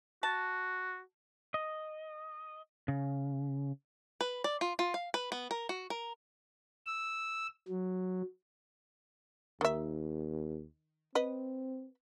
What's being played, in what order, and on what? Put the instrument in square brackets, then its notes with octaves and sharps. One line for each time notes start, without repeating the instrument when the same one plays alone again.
[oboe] F#4 [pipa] A5
[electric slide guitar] D#5
C#3
[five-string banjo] B4
D5
F4
F4
F5
B4
B3
A#4
F#4
A#4
[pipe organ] E6
F#3
[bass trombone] D#2 [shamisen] D#3 E5
[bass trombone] C4 [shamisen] B4 D#5